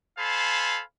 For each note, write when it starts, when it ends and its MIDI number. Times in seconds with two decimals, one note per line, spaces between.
0.19 0.81 69
0.19 0.81 72
0.19 0.81 77
0.19 0.81 80
0.19 0.81 81
0.19 0.81 83